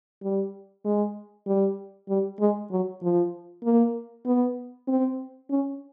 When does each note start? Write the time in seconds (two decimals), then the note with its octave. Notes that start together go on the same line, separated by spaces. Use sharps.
0.22 G3
0.85 G#3
1.47 G3
2.09 G3
2.40 G#3
2.71 F#3
3.02 F3
3.63 A#3
4.26 B3
4.88 C4
5.50 C#4